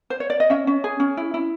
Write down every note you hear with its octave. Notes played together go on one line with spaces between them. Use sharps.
C5
C#5
D5
D#5
C#4 E5
C#4
G#4
C#4
E4
E4